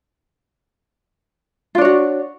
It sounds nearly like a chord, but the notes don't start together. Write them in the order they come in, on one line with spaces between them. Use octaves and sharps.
F4 D4 C#5 F#4